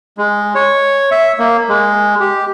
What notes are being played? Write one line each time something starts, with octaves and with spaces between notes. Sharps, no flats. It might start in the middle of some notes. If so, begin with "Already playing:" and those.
G#3
C#5
E5
A#3
G#3
G4